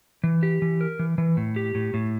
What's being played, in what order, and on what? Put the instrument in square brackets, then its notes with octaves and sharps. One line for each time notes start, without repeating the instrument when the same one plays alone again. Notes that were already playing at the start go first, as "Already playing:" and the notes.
[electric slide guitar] E3
G4
E3
A#4
E3
E3
A2
G4
A2
A2